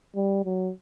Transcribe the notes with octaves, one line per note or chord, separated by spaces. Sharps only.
G3
F#3